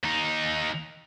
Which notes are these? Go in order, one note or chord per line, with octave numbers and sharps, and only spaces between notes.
D#2 D#4